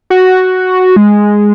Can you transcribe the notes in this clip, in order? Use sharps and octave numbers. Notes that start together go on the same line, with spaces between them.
F#4
G#3